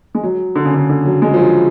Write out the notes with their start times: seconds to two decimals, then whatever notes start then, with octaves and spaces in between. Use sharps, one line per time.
0.15 G#3
0.23 F#3
0.56 D3
0.65 C#3
0.74 D3
0.89 D3
1.06 F#3
1.22 G#3
1.34 F3
1.39 F#3